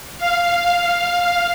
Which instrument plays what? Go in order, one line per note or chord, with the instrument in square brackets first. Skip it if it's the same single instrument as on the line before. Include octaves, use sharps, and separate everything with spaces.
[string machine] F5